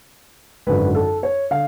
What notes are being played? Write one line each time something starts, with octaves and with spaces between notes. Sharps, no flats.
G#1 F#2 D3 B4
A4
C#5
D3 F5